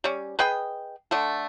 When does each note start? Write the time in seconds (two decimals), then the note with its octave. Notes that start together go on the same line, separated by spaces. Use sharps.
0.04 G3 C#4
0.39 G#4 B4 D#5 G5
1.11 D3 A3 A4